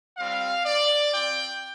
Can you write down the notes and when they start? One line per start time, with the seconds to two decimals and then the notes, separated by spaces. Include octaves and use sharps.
0.18 G3 C4 F4 F5
0.65 D5
1.12 C4 F4 G5